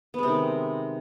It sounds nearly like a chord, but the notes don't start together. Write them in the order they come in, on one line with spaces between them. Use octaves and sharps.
B3 G#3 C3 D#3